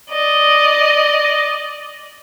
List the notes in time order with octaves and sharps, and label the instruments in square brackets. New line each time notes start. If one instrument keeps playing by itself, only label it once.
[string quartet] D5 D#5